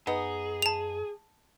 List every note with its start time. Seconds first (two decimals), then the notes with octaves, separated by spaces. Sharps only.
0.07 F#2 B3 D#4 G#4
0.62 A5 F7